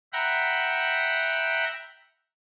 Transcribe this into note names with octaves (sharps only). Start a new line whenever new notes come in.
E5 F#5 G5 A#5 B5